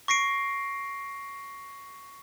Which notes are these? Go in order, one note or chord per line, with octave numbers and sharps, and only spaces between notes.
C#6 A#6 C7 D7